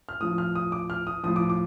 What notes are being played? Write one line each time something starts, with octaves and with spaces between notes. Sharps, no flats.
F6
A2 F3 D#6
F6
D#6
D6
F6
D#6
A2 F3 D#6
D6
D6